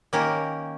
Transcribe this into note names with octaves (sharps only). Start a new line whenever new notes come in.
D#3 A#3 C#4 G4 A#4